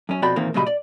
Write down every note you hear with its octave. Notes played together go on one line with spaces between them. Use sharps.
F#2 C#4
F2 B2 F#4 D5 G5 B5
E2 A#2 D#3 A#3 C4
A#2 C#3 F#3 G3 D#5 B5
D5